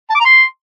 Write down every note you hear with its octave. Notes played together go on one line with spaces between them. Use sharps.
A5
D6
A#5
C6